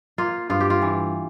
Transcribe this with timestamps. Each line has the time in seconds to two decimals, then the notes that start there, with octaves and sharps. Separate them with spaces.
0.18 A#3 F4
0.50 G2 F4
0.60 G4
0.70 F4
0.82 E3